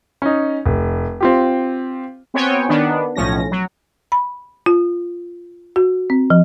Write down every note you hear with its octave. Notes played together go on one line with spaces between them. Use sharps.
C#4 D#4
F1
C4 F4 G4
B3 C4 F#4 C#5 G5 G#5
D#3 B3 D4
B1 A2 F3 C#4 A#6
F#3
B5
F4
F#4
C4
F3